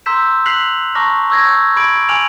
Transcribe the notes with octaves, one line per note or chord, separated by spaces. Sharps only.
A#5 C6 E6 G6 B6 E7
F#6 B6 C7 F7 F#7
A5 A#5 C#6 D6 F6 A#6
C#6 E6 G6 G#6 A#6
B5 D6 G#6 D7 F#7
G#5 D6 F6 D7 F7 F#7